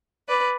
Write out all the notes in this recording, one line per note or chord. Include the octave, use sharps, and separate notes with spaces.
B4 D5